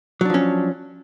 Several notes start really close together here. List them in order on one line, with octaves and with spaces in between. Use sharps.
F#3 D4 F3 C#4